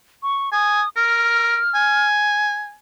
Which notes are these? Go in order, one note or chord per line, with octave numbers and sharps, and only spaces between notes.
C#6
G#5 D#6
A#4 F6
G#5